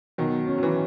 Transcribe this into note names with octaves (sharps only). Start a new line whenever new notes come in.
B2 D#3 F#3
C#4
F#3
E3